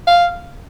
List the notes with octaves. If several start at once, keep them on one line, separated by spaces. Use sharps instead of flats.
F5